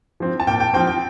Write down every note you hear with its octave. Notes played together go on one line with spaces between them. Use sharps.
F3 C4
A5
A#2 G5
G5
F3 C4 G5
G5